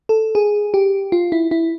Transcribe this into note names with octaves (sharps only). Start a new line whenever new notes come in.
A4
G#4
G4
F4
E4
E4